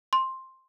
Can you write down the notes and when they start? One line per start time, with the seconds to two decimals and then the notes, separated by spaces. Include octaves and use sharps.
0.13 C6